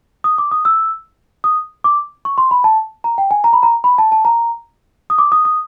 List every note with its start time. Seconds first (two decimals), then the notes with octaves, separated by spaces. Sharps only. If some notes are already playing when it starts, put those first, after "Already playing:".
0.24 D#6
0.38 D6
0.51 D#6
0.65 E6
1.44 D#6
1.84 D6
2.25 C#6
2.38 C6
2.51 B5
2.64 A5
3.04 A#5
3.18 G5
3.31 G#5
3.44 A#5
3.53 B5
3.63 A#5
3.84 B5
3.98 A5
4.12 A5
4.25 A#5
5.10 D#6
5.18 D6
5.32 D#6
5.45 D#6